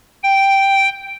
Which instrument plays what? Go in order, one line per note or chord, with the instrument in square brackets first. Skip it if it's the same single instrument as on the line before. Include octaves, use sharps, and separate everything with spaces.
[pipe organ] G5